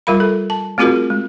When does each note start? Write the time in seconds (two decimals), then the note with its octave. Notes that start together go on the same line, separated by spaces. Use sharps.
0.07 G3 F4 A#4 F5 B5
0.20 A4
0.50 A5
0.78 A3 C4 F4 F#4 G#4 A#4
1.10 G#3